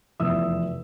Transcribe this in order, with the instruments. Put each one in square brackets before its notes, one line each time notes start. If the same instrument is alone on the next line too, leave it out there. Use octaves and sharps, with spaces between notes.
[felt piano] F1 E2 E5 D#6 E6